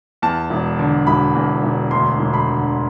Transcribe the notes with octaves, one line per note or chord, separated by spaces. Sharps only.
E2 A5
E1
D3
E1 B5
E2
E1
D2 C6
E1
B5
D3